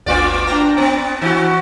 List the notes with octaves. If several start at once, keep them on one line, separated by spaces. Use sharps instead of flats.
G1 D2 A#3 F4 D5
D4 G5 A#5
B3 C4
E3 E4 F#4